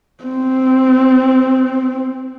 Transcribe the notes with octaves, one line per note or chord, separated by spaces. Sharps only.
C4